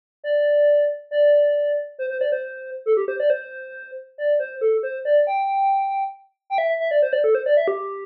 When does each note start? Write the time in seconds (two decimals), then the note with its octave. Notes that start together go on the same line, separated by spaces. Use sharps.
0.24 D5
1.11 D5
1.99 C5
2.10 C5
2.21 D5
2.32 C5
2.86 A4
2.97 G4
3.08 C5
3.20 D5
3.30 C5
4.18 D5
4.39 C5
4.61 A4
4.83 C5
5.05 D5
5.27 G5
6.50 G5
6.58 E5
6.80 E5
6.91 D5
7.02 C5
7.13 D5
7.24 A4
7.35 C5
7.46 D5
7.57 E5
7.68 G4